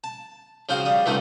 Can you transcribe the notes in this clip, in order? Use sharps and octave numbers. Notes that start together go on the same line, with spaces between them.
A5
C#3 F3 C4 F4 F#4
G3 D#6
C#2 G#2 C#3 A3 C4